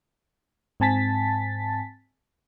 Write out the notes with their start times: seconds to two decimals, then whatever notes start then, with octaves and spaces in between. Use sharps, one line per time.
0.80 G#2 C4 G#5 A5 A6 B6